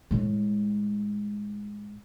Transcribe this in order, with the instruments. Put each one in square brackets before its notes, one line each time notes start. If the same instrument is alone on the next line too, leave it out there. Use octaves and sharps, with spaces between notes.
[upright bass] A2 G#3